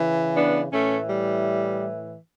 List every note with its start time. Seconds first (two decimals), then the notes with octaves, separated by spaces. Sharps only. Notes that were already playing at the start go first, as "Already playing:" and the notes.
Already playing: C#3 E3
0.36 B3 D4
0.72 A2 E3 A3 C#4
1.09 G3